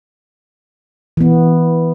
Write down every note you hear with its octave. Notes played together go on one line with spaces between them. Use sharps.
E3 B3